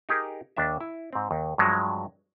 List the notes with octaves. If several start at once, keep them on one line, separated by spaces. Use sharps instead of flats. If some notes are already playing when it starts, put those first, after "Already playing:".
D#4 G4 G#4 A#4
D#2 D4 E5
E4
G#2 C4
D#2
G2 F3 F#3 G#3